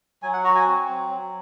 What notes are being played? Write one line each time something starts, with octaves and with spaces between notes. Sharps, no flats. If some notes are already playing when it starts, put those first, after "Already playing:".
F#3 G#5
F#5
F#4 A#5
G#5
C4
F#3
F#3